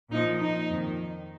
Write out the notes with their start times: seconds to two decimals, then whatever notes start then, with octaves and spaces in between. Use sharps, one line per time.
0.11 A#2 F3 D#4
0.40 D#4
0.70 F2 D#3